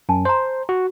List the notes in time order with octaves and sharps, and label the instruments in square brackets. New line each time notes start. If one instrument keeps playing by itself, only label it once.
[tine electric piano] F#2 [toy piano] G#5 A5
[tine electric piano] C5 [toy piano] A#5 C6
[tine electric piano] F#4